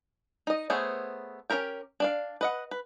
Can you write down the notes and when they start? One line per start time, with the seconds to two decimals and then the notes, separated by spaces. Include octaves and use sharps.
0.47 D#4 D#5
0.70 A3 B3 G#4 C5 C#5
1.50 C#4 F#4 G4 A#4 G5
2.00 D4 D5 F5
2.41 B4 D#5 F#5
2.71 B4